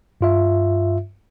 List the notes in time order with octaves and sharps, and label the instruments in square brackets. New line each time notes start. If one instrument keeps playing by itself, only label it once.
[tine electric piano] G2 F4 E5